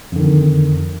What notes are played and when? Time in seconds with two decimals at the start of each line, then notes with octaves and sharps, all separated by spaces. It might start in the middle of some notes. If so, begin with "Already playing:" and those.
0.12 F2
0.16 D3
0.20 D#3